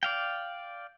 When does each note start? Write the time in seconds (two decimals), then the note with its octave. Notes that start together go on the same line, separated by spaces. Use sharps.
0.03 D5 F5 G5